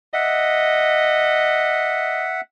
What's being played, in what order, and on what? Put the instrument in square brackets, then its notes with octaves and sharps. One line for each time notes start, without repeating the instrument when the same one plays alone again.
[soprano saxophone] D#5 [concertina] E5 F#5